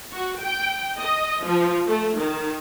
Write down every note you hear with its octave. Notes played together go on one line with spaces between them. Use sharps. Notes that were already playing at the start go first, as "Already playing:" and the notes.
F#4
G5
D#5
F3
A3
D#3